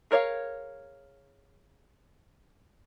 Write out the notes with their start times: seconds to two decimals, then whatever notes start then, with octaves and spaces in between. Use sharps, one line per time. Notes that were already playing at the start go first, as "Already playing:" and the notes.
0.11 G#4 A#4 C#5 E5 F5